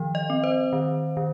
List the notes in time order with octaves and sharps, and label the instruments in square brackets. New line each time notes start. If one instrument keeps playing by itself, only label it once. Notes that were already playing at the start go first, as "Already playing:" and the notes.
Already playing: [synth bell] D#3 F3
D#5
C4
C5
D#3
D#3